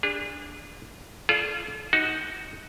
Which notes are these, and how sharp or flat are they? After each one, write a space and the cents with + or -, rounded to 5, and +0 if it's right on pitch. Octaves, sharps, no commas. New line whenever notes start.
D4 +0 G#4 -40
F4 -20 A4 -45 D5 +0
D#4 +15 F#4 +0